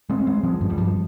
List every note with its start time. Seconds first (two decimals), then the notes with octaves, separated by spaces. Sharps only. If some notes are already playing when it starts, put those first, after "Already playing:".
0.10 G#3 C4
0.20 C#4
0.27 G#3 C4
0.44 F3 G#3
0.61 G2 F3
0.70 G3
0.78 F3